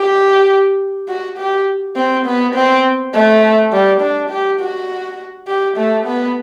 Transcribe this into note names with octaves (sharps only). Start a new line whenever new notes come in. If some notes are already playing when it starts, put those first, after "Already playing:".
Already playing: G4
F#4
G4
C4
B3
C4
A3
G3
D4
G4
F#4
G4
A3
B3